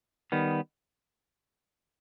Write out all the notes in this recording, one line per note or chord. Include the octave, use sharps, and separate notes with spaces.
D#3 G3 B3